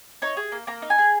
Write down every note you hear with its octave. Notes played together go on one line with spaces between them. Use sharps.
D#4 C#5
G#4
A#3
A#3 A#5
D#4
G#5
G#4